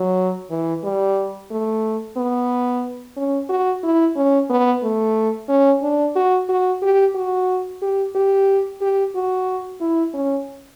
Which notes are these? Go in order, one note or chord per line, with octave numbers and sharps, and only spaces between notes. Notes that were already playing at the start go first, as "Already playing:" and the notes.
Already playing: F#3
E3
G3
A3
B3
C#4
F#4
E4
C#4
B3
A3
C#4
D4
F#4
F#4
G4
F#4
G4
G4
G4
F#4
E4
C#4